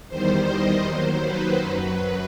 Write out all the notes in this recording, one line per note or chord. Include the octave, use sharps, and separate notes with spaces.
E2 D#3 G3 C5
D#5
D#2 D#3 F#3 C5
B4
F#2 F#3 B4